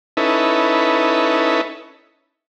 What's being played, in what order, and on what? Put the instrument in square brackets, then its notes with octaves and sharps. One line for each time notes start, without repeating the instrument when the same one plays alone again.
[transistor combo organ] C#4 D#4 E4 A4 B4